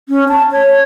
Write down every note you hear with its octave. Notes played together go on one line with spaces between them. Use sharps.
C#4
A5
C#5